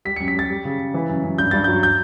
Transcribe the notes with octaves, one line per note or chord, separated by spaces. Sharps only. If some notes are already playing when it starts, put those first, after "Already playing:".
G3 B6
C#7
F#2
B6
G3 A6
G3
C#3
C#3
E3
F#2
F#2
G2 G6
G2 A6
F#3 G6
G6